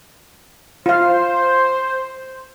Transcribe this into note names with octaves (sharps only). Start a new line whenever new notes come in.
F4 C5 F5